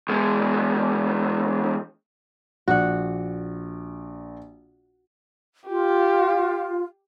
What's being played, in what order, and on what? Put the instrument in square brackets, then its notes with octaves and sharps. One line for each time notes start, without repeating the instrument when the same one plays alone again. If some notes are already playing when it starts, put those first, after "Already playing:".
[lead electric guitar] E2 G#3
[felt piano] A#1 D5 [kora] F#4 F#5
[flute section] F4 [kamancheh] G4